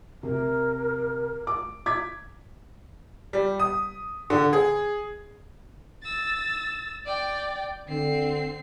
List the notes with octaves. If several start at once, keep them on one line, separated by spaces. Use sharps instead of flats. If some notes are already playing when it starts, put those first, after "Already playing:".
C3 A#4
D6
D6 G#6 B6
G3
D#6
D3
G#4
E6 A6
D5 G5
D3 C4 C7